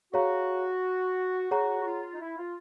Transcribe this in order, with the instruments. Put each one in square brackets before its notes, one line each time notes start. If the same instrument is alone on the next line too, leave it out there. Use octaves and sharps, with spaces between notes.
[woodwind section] F#4 [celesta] G#4 C#5 F5 A#5
[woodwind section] F#4 [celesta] G#4 C#5 F#5 A#5
[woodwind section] F#4
F4
D#4
E4
F4